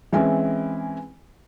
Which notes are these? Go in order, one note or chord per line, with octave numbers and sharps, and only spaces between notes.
E3 G#3 C4 C#4 E4